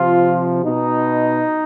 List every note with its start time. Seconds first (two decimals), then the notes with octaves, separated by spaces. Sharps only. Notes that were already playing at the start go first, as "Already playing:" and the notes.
Already playing: C3 F3 F4
0.64 B2 D#4